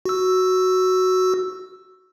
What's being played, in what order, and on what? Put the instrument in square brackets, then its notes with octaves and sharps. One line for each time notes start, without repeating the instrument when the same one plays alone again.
[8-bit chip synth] F#4 E6